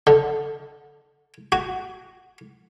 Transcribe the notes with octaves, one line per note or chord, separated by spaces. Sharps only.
D3
F#4